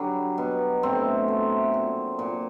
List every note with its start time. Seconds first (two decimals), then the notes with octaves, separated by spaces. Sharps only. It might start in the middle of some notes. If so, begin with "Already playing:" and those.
Already playing: D3 F#3 G3
0.38 B2
0.83 A2 C4
1.28 A3
1.74 A#2
2.19 A#2